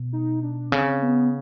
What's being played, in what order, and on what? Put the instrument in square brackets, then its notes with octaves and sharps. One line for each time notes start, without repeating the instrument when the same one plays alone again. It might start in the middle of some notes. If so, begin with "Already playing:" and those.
Already playing: [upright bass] B2
[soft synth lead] D#4
D4
[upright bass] C#3 [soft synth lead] C4
[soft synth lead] B3